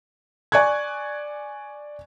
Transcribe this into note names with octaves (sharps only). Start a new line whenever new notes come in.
D5 G#5 C#6 F#6 G#6